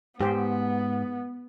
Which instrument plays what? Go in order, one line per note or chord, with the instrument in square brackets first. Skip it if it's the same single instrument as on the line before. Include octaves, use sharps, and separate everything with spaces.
[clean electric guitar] G#2 [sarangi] B3 [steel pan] G4 C5